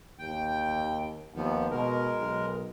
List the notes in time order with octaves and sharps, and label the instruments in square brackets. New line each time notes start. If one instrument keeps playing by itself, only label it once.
[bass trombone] D#2 [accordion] G5
[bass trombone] D#2 [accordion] F3 B3
[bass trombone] B2 [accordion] G#3 A#4
[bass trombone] B1